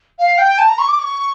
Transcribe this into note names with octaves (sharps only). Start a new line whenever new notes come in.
F5
G5
A5
A#5
C#6
D6
C#6